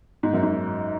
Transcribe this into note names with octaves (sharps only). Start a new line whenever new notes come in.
G#2
F#2
G#2